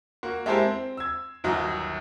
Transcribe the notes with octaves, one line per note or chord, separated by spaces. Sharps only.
A#3 F#4
G#3 E4 G4 A4 A#4 C5
C4
E6 G#6
G1 D#2 F#3 F#4 D#5 A#5